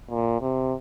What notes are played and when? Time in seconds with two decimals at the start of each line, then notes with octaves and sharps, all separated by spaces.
0.11 A#2
0.42 C3